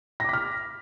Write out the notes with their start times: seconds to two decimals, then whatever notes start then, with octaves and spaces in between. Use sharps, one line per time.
0.20 A#6
0.24 D6
0.29 B6
0.33 F6